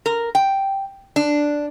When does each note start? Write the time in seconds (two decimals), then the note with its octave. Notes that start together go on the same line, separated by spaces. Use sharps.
0.06 A#4
0.35 G5
1.16 D4